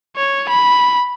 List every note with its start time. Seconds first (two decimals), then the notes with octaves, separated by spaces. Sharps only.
0.16 C#5
0.49 B5